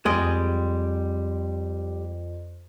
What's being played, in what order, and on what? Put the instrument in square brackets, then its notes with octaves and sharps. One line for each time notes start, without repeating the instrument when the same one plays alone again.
[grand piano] F2 D7 [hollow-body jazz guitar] G3 G#3 D#5